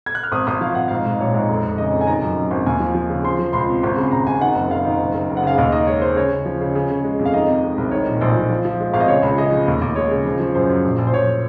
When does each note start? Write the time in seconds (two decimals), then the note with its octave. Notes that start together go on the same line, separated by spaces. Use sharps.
0.06 G#6
0.15 F#6
0.23 F6
0.32 G#1 D#6
0.47 G#1 D#6
0.61 F3 F5
0.75 G#1 F#5
0.88 G#2 F5
1.05 G#2
1.20 A#1 C#5
1.34 G#2
1.49 F1
1.64 F1
1.78 C#3 D#5
1.92 F2
2.01 G#5
2.07 D#3 A#5
2.21 F#2
2.37 F#2
2.51 G#1
2.66 D#2 G#5
2.80 F3
2.94 F3
3.09 C#3
3.24 F3 C6
3.39 F3
3.53 C#2 C6
3.69 C3
3.83 G#1
3.97 C#3
4.11 G#1 A#5
4.26 G#1 G#5
4.41 D#3 F#5
4.55 F#1
4.71 F#1 F5
4.84 D#3
4.99 F#1
5.14 F#1
5.29 F#1
5.37 F#5
5.43 C#3 F5
5.58 D#2 D#5
5.72 D#3 D#5
5.87 G#3 C#5
6.01 G#3 C5
6.16 C#3 C#5
6.31 C#3
6.45 F3
6.61 C#3
6.75 C#3
6.90 C#3
7.04 G#3
7.19 F2
7.25 F5
7.34 D#3 D#5
7.48 C3
7.63 G#3
7.78 C2
7.91 D#3 C#5
8.07 A#1
8.21 A#1 C5
8.35 A#1
8.50 F3
8.65 F3
8.80 G#3
8.93 G#1 F5
9.00 D#5
9.08 C#3 C#5
9.23 C#2
9.38 C#3 D#5
9.52 F3
9.68 D#2
9.81 D#2
9.96 G#3 C#5
10.11 C#3
10.25 F3
10.40 F3
10.54 F#2 C5
10.69 F#2
10.84 A#1
10.98 A#1
11.07 C5
11.13 A#1 C#5